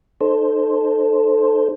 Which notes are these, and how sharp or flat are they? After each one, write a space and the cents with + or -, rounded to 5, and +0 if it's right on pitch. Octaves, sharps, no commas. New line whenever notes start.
D#4 -30 A4 +0 C5 +0